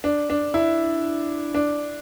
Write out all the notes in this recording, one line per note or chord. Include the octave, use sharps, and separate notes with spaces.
D4
D4
E4
D4